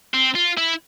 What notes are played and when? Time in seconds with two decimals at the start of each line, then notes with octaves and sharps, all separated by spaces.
0.14 C4
0.35 F4
0.57 E4